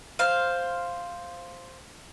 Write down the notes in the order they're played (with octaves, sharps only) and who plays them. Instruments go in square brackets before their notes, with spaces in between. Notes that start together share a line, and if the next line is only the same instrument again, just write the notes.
[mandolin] C5 F5